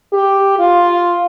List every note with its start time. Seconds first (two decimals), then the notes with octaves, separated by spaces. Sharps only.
0.13 G4
0.59 F4